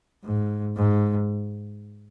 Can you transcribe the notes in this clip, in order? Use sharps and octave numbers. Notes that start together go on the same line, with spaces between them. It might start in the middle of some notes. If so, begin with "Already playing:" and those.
G#2
G#2